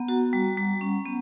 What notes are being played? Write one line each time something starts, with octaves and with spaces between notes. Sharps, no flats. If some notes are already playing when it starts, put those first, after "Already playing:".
Already playing: B3 F#5 A#5
F#4
G3
G3
C#4
B3